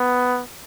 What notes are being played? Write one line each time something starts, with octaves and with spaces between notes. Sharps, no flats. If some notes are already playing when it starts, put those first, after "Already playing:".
Already playing: B3